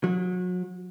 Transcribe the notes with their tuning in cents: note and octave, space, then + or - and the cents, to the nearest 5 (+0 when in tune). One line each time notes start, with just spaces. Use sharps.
F#3 -35